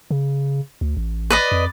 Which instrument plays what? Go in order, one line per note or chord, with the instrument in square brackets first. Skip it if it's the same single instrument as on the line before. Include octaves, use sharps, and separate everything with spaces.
[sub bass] C#3
D2
A1
[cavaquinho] B4 D5 D#5
[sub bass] F2